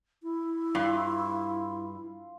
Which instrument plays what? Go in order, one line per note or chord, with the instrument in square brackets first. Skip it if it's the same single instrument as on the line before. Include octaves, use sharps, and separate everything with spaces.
[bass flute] E4
[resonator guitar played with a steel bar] G2 [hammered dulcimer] F4